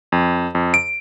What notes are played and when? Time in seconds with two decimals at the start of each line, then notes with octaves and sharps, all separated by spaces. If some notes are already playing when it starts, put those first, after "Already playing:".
0.12 F2
0.55 F2
0.74 D7